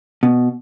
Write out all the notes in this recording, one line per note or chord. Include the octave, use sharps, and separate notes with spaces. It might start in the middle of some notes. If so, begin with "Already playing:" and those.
B2